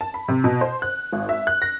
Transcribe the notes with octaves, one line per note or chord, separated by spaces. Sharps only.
A5
B5
C3
B2
C5
F#6
G#1
E5
F#6
A#6